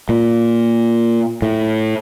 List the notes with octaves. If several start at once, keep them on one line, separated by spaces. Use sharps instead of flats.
A#2
A2